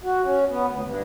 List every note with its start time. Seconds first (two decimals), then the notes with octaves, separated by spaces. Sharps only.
0.04 F#4
0.24 C#4
0.49 B3
0.69 D2
0.83 G2